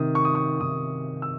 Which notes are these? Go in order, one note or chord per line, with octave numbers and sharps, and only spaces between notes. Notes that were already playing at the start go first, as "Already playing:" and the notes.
Already playing: C3 D#3 D#6
C#6
D#6
C#6
C3 D#3 D#6
E6